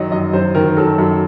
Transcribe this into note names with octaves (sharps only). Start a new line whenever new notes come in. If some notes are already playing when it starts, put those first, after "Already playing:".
Already playing: F#2 D#3 F#3 D#5
F#2 D#5
F#2 C5
D#3 A#4
F#3 A4
F#2